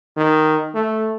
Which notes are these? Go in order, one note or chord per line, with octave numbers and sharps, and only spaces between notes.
D#3
A3